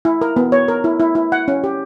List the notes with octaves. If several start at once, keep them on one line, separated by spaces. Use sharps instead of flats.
E4
A#4
B3
C#5
A#4
E4
E4
E4
F#5
C#4
G4